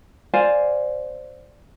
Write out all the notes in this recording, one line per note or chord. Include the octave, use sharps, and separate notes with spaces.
C5 D5 F5 G#5